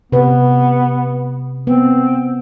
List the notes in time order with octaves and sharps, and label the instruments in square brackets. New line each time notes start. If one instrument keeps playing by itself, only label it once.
[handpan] C3 B4 [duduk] B3
[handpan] B3 [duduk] C4